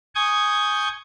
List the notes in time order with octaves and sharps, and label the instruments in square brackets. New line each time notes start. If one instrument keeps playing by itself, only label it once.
[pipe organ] G#5 C#6 D#6 G6 G#6